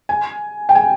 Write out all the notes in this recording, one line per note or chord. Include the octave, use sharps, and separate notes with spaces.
G#5
G5
G#5